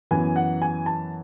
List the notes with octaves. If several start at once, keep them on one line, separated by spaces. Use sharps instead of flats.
F#2 E3 B3 G#5
F#5
G#5
A5